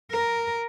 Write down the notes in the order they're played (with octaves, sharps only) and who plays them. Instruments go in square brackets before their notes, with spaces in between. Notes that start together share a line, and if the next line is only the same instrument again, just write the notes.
[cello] A#4